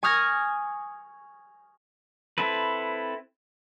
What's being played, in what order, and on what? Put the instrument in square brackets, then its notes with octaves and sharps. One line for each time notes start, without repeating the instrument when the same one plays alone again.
[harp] G#5 C#6 D#6 F6 G#6 A#6
[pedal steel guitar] C4 E4 A4 B4